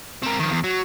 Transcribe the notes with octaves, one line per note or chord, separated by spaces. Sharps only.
C4 A#4
D#3 F3
E2
F#3